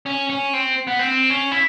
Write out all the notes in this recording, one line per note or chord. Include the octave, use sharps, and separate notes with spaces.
C#4
C#4
C4
B3
C4
C#4
E4